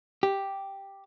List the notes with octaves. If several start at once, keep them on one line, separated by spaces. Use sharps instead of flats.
G4